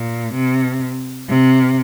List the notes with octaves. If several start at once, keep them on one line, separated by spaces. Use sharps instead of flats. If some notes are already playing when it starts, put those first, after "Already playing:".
Already playing: A#2
C3
C3